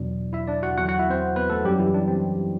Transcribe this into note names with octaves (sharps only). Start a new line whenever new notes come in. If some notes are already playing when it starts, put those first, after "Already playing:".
Already playing: E2 B2 F#3 D4 D5
E4 E5
D4 D5
F#4 F#5
E2 D3 F#3 F#4 F#5
F#4 F#5
E4 E5
C4 C5
B3 B4
A3 A4
F#2 F#3 G3 G4
E3 E4
D4
C4